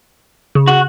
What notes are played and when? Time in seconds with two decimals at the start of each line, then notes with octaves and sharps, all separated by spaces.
0.55 C#3
0.68 F#4